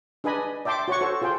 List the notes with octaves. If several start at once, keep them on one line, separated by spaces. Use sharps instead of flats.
D4 G#4 B4 D#5 G#5 B5
D5 E5 G5 A5 C6 D6
F#4 C#5 F#5 C#6
F#4 A4 C5 C#5
F4 G#4 C5 G5